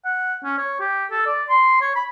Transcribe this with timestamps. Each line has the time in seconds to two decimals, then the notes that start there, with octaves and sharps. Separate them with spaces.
0.05 F#5
0.44 C#4
0.58 C#5
0.80 G4
1.11 A4
1.26 D5
1.49 C6
1.82 C#5
1.95 B5